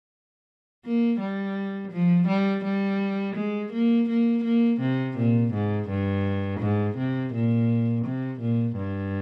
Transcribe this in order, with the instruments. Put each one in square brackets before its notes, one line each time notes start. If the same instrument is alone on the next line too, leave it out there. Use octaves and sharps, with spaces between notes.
[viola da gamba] A#3
G3
F3
G3
G3
G#3
A#3
A#3
A#3
C3
A#2
G#2
G2
G#2
C3
A#2
C3
A#2
G2